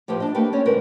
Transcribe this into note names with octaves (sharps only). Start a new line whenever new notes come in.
A2 F3 G4 G#4 B4
D4 D#5
A3 A#3 D4 G4 A#4 B4
C4 C#4 C#5
E2 G#2 D3 A3 A#4 B4